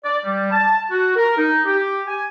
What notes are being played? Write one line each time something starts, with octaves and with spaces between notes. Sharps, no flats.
D5
G3
A5
F#4
A#4
D#4
G4
G#5